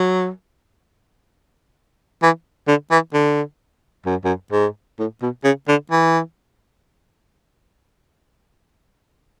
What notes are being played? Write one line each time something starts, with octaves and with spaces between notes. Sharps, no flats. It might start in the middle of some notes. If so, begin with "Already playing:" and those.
Already playing: F#3
E3
D3
E3
D3
F#2
F#2
G#2
A2
B2
C#3
D3
E3